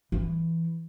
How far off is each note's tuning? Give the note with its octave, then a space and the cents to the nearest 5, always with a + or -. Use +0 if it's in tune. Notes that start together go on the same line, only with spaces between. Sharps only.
E3 +5